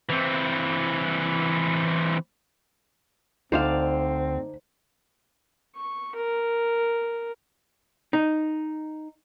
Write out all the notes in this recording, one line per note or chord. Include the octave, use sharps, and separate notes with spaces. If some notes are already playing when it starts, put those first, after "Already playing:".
E3 C4
D2 C4 D#4 C5 D5 F5
C#6
A#4
D#4